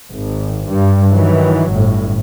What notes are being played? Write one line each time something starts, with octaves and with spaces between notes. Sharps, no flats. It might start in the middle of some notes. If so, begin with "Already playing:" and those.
G#1
G2
D#3 E3 F#3
G1 A2